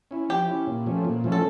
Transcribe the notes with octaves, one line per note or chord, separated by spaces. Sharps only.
C#4 E4
F3 G4
C#4 E4
A#2
F3 A3 C#4
A#2
F3 A3 C#4
A4